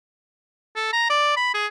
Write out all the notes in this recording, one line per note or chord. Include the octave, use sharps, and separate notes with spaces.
A4
A#5
D5
B5
G#4